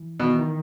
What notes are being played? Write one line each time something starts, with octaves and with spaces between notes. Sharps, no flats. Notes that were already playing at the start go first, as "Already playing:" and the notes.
Already playing: E3
B2 D#3
E3
D#3